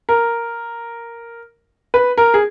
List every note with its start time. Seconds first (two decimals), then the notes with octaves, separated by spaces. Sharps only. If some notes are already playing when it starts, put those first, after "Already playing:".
0.09 A#4
1.94 B4
2.18 A#4
2.34 G#4